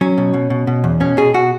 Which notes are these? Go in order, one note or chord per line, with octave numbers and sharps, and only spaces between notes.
F#3 C#4
B2
B2
B2
B2
E2
B2 C#4
B2 G#4
B2 F#4